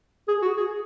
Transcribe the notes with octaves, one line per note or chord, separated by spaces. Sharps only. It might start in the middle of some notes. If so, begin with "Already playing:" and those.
G#4
F#4
G#4